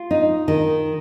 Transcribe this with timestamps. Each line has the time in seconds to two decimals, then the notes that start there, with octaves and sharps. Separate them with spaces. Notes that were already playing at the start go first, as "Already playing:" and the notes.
Already playing: F4
0.11 D#4
0.48 D#3